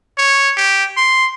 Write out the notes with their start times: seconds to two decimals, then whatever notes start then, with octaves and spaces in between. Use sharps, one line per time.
0.18 C#5
0.57 G4
0.97 C6